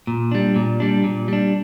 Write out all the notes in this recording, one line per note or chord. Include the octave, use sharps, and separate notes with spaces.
A#2
G3 D4
A#2
G3 D4
A#2
G3 D4